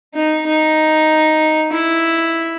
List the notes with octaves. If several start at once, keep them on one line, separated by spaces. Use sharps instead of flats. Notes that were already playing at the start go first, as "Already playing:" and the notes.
D#4
D#4
E4